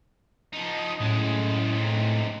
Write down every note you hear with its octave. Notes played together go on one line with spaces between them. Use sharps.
F3 D#4
D#6
F#2 A2 G#3
G#2 C3